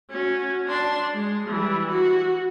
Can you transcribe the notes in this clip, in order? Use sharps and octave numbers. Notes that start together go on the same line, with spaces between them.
C#4 F#4
D4 C6
G#3
E3 G3
F#4